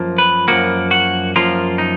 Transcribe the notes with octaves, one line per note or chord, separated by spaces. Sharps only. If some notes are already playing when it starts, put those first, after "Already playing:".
Already playing: F#2 F3 A#3
B4
F#2 F3 A#3 F#4
F#4
F#2 F3 A#3 F4
D#4